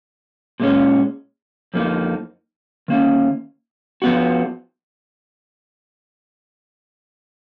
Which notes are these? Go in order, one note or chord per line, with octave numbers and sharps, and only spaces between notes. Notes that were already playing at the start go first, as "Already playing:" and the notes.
A#2 G#3 C#4
F2 F3 A#3 D#4
D#3 A#3 C#4
F3 B3 F#4